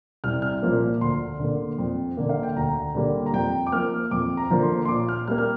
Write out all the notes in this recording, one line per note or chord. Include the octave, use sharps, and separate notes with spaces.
C2 F6
F6
A#2 F3 A#3
D2 C6
D3 A#3
F2
D3 A#3
F5
G5
D2 A#5
D3 G3 A#3
A#5
F2 G5
D6
F3 A#3 F6
F2 D6
A#5
D3 F3 A#3
C6
C6
A#2 D6
F6
G3 A#3 F6
F6